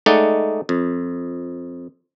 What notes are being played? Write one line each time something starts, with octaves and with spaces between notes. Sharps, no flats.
G#3 A3 D#4 D5 F#5
F2